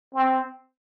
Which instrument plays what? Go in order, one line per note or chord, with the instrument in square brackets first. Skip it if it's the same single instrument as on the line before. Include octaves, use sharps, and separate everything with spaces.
[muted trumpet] C4